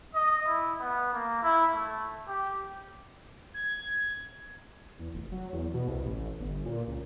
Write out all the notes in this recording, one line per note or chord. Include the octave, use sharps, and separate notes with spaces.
D#5
E4
B3
A#3
E4
A3
G4
G#6
E2
F1
F#3
E2
B2
C2
A1
G1
A#2
C#2